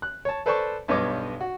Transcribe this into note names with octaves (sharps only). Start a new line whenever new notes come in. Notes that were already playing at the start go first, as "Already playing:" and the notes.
F#6
C#5 A5
A4 B4 C5 D5 A5 C#6
B1 G2 B3 C#5 D#5 D6
F#4